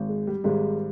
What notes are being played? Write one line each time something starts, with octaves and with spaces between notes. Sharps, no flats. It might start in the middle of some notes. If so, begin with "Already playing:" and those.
Already playing: G#1 G#2
G#3
G3
G#1 G#2 G3 G#3